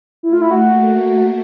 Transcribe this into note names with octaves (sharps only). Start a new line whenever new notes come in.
A3 E4
F4
E4
F#4
A#3